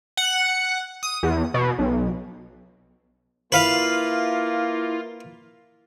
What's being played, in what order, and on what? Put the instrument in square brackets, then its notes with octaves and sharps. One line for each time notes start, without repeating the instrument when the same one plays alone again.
[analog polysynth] F#5
D#6
E2
B2
B1
[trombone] A#3 [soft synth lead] E4 [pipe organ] F4 [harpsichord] B4 F5